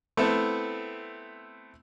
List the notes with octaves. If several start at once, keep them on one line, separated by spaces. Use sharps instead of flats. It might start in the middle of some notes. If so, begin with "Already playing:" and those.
A3 B3 C4 E4 A4